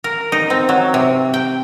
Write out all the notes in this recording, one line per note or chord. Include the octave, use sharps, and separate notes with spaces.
A#4
D#4
C4
F#3
C3
G5